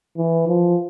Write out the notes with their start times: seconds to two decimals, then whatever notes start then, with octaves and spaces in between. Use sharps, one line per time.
0.18 E3
0.48 F3